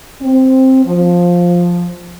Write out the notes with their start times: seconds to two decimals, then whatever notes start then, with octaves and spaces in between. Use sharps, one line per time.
0.21 C4
0.84 F3